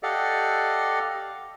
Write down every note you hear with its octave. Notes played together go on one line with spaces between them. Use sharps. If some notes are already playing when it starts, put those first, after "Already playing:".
G4 A4 D5 D#5 F5 F#5